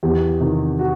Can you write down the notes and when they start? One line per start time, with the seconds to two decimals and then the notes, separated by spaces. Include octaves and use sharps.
0.03 E2 G4
0.40 C3 D#3
0.79 F#4